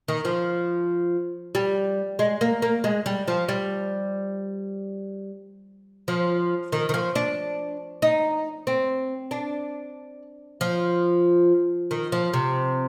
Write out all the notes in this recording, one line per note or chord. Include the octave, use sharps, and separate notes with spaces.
D#3
F3
G3
G#3
A#3
A#3
G#3
G3
F3
G3
F3
D#3
D#3
F3
D4
D#4
C4
D4
F3
D#3
F3
C3